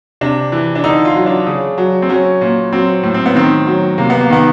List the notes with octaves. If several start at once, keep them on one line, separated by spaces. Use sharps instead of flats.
C3 D4
E3
D4
D3 D#4
F4
F#3
D4
C#3
F#3
C4
F#3 C#4
A#2
F#3 C4
A2
C4
B3
D#3 C4
F#3
C3 A#3
B3
A#3
D#3 B3